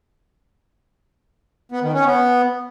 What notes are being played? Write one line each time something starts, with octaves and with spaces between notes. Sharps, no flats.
B3
D#3
C#4
B3